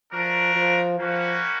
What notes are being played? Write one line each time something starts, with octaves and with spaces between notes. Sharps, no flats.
F3 A3 D4 F#4 A#4
F3
F3 G3 A#3 C#4 F#4